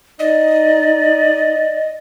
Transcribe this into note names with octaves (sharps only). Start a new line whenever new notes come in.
D#4 D5 D#5